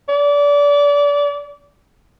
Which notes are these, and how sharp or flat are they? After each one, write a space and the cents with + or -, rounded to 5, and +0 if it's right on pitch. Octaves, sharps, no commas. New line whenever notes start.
D5 -30